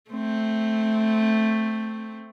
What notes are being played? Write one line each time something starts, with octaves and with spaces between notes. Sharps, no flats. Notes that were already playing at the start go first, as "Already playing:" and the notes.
A3 C4